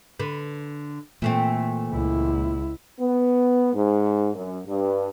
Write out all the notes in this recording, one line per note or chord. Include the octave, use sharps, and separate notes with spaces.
D3 B4
A#2 E3 A3 C4
C#2 E4
B3
G#2
F#2
G2